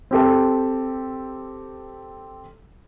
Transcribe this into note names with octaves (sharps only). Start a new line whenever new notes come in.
C4 G4 A4